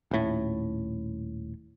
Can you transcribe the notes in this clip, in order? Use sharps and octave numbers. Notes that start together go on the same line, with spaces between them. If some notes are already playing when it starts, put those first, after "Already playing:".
D#1 A2